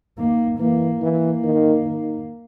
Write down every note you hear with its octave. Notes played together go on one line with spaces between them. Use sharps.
D#3 A#3
E3 A#3
E3 A#3
D#3
D#3